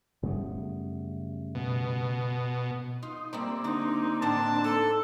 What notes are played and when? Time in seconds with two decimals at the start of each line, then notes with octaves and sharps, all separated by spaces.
0.23 F#2 C#3 G3 A3 B3
1.55 B2
3.03 D#4 F4
3.33 G3 A3 A#3 C4 E4 D5
3.64 D3 D#4
4.22 A2 D3 D4 D#4 A5
4.64 D#4 A4